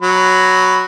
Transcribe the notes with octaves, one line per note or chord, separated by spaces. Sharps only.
F#3 B5